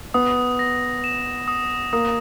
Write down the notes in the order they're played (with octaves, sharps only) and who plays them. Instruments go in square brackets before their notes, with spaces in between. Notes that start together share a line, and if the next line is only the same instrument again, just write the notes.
[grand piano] B3 [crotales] D#6
[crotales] A#6
E7
D#6
[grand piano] A#3 [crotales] D#6